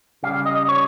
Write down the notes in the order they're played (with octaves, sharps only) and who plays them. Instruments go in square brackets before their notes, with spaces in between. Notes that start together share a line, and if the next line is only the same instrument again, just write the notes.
[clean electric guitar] C#3 G3 F5
D#5
C#5